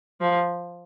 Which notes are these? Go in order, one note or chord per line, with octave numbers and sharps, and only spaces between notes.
F3